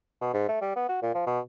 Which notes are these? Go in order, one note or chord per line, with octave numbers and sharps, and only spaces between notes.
B2
G#2
A3
G3
B3
F#4
A#2
F3
B2